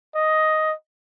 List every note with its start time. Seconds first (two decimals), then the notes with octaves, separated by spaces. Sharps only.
0.16 D#5